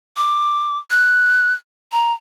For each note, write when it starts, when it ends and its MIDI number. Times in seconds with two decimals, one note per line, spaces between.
0.17 0.78 86
0.90 1.53 90
1.92 2.12 82